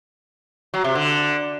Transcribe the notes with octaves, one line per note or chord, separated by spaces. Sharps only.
F#3
C3
D3